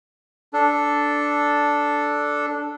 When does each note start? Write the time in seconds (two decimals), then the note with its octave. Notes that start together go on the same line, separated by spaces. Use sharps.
0.53 D4 A4